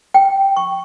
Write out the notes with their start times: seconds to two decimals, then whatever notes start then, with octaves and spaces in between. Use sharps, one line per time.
0.14 G5
0.57 C#6